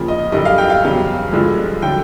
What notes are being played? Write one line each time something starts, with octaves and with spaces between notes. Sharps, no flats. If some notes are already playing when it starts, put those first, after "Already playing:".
Already playing: D#2 C#3 F3
D#5
F#2 D3 G3 D#5
F5
G5
F5
E2 C#3 F#3
G2 D3 F3 G#3
D3 F#3 G5